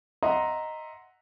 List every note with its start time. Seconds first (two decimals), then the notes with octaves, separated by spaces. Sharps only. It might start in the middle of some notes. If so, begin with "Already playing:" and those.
0.23 D#5 E5 F#5 A#5 C6